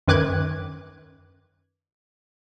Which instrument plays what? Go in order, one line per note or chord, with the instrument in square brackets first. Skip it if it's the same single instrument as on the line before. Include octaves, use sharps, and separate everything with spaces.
[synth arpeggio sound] F#2 D#3 B4 D6 F#6 G#6